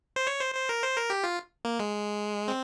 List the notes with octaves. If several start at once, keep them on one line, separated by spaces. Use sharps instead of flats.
C5
C#5
C5
C5
A#4
C5
A#4
G4
F4
A#3
G#3
C4